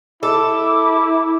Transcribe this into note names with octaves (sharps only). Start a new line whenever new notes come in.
E4 A4 D6